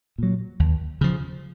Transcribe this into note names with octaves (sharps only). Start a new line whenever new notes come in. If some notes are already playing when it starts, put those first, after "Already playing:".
A#2 F#3
D#2
C#3 F3